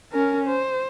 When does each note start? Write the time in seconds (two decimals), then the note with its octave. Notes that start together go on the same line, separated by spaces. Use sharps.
0.12 C#4 A#4
0.47 C5